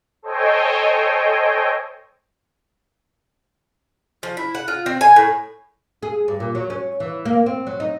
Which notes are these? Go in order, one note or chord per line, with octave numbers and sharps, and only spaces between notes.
A4 C5 C#5 D#5 G5 G#5
F3
E4
F#5
F4
C4
G#5
A2
G#4
G2
A#2
F#3
C#4
E3
A#3
C4
F#3
D#4